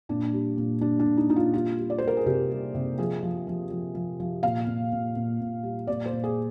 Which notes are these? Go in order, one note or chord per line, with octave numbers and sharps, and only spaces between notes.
A#2 D4
G3
A#2
G3 D4
D4
A#2
D#4
A#2 D#4
F4
G3 F4
G3
D5
G3 C5
A#4
G#4
C3 G4
G3
C3
F3 G#4
F3
F3
F3
F3
F3
A#2 F5
A#2
A#2
A#2
A#2
G3
A#2 D5
C5
A#2
G#4